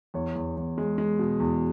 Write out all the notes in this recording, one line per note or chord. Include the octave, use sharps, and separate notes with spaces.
E2 C#5
E2
E2
G#3
G#3
B2
E2